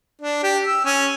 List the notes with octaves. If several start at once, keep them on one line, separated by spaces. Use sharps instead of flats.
D4
G4
E6
C#4